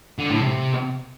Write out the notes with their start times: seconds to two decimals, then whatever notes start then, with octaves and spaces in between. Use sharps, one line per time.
0.18 D3
0.30 A2
0.42 C3